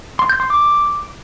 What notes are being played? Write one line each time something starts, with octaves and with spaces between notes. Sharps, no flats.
C6
G6
C6
D6